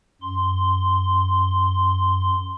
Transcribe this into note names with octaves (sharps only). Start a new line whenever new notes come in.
F#2 C6